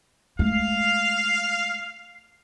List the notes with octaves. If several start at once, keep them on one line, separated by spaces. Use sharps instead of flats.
G#3 A3 F5